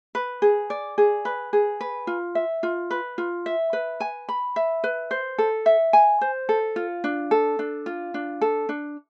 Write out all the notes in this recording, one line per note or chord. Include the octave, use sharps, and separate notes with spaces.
B4
G#4
D5
G#4
B4
G#4
B4
F4
E5
F4
B4
F4
E5
B4
G#5
B5
E5
B4
C5
A4
E5
G#5
C5
A4
F4
D4
A4
D4
F4
D4
A4
D4